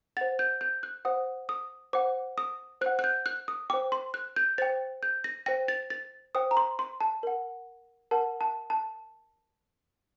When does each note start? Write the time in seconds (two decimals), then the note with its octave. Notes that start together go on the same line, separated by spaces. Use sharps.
0.17 C5 F#5 A6
0.39 G6
0.61 G6
0.83 F#6
1.05 C5 F#5 D#6
1.49 D#6
1.93 C5 F#5 D6
2.38 D#6
2.81 C5 F#5 F#6
2.99 F#6
3.04 G6
3.26 F#6
3.48 D#6
3.70 C5 G5 D6
3.92 C6
4.14 F#6
4.36 G6
4.58 C5 G5 A6
5.03 G6
5.24 A#6
5.46 C5 G5 A#6
5.68 A6
5.90 A6
6.35 C5 G5 D#6
6.51 A#5
6.57 C6
6.79 C6
7.01 A5
7.23 A#4 F#5
8.11 A#4 F#5 A5
8.41 A5
8.70 A5